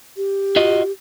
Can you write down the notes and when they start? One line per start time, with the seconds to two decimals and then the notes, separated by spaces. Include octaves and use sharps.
0.17 G4
0.56 F4 F#4 D#5